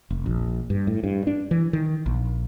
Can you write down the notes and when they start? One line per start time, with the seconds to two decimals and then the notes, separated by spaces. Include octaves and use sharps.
0.10 F1
0.26 A#1
0.70 G2
0.87 A2
1.04 G2
1.27 D4
1.51 E3
1.73 D#3
2.06 A#1